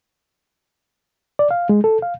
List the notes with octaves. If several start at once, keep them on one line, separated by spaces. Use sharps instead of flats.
D5
F5
G#3
A4
F5